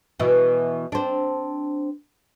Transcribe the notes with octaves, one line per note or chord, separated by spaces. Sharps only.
B2 E3
C4 D4